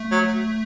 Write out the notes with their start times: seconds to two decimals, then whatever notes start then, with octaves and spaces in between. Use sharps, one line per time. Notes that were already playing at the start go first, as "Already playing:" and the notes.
Already playing: A3
0.12 F#3